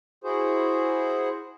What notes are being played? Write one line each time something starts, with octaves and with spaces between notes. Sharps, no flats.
E4 F#4 G#4 C5